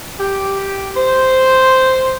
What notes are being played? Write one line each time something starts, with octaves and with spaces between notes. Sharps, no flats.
G4
C5